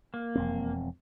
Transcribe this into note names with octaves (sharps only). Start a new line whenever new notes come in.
A#3
E1 F2 C4